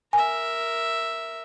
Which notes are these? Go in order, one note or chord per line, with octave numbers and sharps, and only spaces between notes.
A#4 E5 G#5